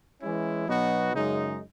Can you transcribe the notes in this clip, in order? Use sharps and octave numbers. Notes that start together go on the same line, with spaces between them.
E3 G#3 C#4 E4
B2 F#3 B3 D#4 F#4
F#2 C#3 G#3 D#4